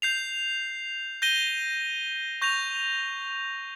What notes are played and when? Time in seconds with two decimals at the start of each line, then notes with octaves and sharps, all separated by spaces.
0.02 G6 C7 F7
1.22 G6 A#6 D#7 G7
2.42 C#6 G6 A#6 F7